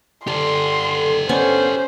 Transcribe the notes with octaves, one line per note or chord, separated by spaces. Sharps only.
D3 G4 A4 C6
B3 C#4 D4 C5